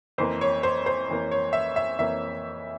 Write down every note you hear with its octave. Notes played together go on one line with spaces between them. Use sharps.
F2 E3 A#3 C5
C#5
C5
C5
F2 E3 A#3
C#5
E5
E5
F2 E3 A#3 E5